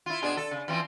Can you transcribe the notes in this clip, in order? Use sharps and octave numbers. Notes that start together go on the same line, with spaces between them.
E4 F4
B2 D4 G#4
A4
C#3
E3 F3 C4